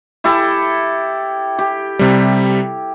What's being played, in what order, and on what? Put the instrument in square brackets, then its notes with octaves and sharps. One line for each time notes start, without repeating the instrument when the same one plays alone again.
[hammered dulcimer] E4 G4 A4
G4
[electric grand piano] C3 G3